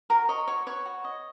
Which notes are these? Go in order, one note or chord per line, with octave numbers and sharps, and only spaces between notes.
F#4 A#4 A#5
C#5 D#5 C#6
F#4 C#5 C#6
B4 C#5 C#6
F#4
D#5